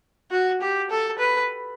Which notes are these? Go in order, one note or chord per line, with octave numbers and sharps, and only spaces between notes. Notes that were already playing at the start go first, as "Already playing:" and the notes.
F#4
G4
A4
B4